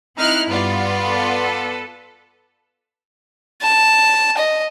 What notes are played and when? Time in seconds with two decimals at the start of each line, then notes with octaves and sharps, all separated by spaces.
0.17 C4 D#4 E4 F6 F#6
0.48 G2 B3 F4 D5
1.06 A4 B4
3.62 A5
4.38 D#5